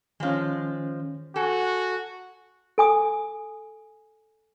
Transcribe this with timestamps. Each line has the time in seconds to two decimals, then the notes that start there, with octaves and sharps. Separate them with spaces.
0.20 D#3 F3 G#3 C#4
1.36 F#4 A4 G#5
2.78 A4 G#5 D#6